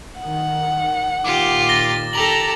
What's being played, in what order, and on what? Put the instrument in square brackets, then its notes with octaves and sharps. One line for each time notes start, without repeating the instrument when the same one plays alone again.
[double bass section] D#3 [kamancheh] F#5
[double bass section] A#2 D#3 [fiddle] F4 G4 [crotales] D6
[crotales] A6 A#6 G7
[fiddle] G4 A4 [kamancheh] A#5 [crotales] F7 F#7